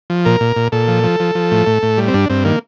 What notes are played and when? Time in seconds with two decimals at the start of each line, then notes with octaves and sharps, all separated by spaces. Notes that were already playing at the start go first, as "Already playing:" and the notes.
0.10 F3
0.25 A#2 A#4
0.40 A#2
0.56 A#2
0.72 A#2 A4
0.88 F3
1.04 F3
1.20 F3
1.35 F3
1.51 A2
1.67 A2
1.83 A2
1.98 G3
2.08 C4
2.14 G2 D4
2.30 G2 C4
2.45 D#3 A#3